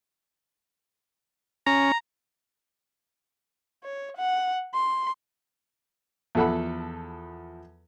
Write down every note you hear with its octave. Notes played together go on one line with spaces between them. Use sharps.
C#4 A#5
C#5
F#5
C6
E2 F3 A4 F#5 B5